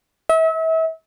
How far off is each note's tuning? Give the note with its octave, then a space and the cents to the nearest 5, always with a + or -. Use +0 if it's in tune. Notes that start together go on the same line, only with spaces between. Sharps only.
E5 -35